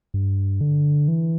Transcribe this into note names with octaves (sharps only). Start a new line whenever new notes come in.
G2
D3
E3